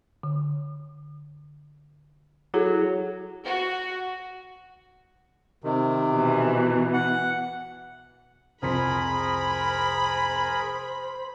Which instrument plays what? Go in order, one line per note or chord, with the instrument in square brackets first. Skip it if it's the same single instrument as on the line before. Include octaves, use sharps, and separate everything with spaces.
[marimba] D3
[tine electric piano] F#3 [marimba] E4 G#4 A4
[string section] F#4
[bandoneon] C3 D#3
[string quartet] B2 E3
[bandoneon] F#5
[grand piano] C2 F2 B6 [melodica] G#4 A#4 [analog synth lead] C5 [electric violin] B5